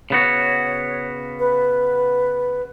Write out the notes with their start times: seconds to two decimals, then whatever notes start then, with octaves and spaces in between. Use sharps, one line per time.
0.10 C#3 B3 F#4 C#5
1.39 B4